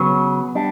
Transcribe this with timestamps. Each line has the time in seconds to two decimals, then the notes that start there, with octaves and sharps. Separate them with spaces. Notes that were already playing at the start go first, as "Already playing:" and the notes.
Already playing: C#3 F#3 B3 C#4
0.55 G3 D4